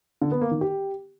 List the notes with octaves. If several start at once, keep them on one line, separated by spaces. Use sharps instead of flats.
D3
B3
A#3
D#3
G4